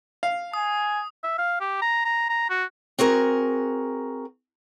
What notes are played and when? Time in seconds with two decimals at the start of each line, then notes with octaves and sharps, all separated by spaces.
0.23 F5
0.54 G#5 D#6
1.24 E5
1.38 F5
1.61 G4
1.82 A#5
2.05 A#5
2.29 A#5
2.50 F#4
2.99 C4 F#4 G#4 A#4